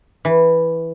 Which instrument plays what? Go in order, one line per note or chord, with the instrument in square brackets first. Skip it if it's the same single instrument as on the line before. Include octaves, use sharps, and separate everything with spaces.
[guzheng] E3